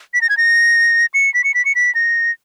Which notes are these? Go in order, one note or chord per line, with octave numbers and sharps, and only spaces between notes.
B6
A#6
G#6
A#6
C#7
B6
C#7
B6
C#7
B6
A#6